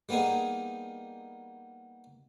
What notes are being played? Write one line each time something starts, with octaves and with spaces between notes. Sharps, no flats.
G3 A#3 B3 D#4 G#4